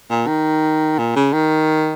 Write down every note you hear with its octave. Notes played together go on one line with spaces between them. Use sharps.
A#2
D#3
A#2
C#3
D#3